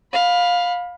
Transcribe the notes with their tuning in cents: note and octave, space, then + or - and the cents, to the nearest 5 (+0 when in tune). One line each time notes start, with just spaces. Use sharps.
F5 +20 B5 +0